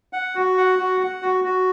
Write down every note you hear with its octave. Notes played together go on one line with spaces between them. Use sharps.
F#5
F#4
F#5
F#4
F#5
F#4
F#4